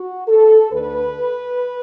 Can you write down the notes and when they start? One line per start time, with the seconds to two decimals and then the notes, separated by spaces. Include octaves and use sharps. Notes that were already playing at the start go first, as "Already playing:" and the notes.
Already playing: F#4
0.27 A4
0.71 D2 D3 B4